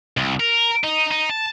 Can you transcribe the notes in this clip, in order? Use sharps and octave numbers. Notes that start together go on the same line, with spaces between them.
C2
A#4
D#4
D#4
A5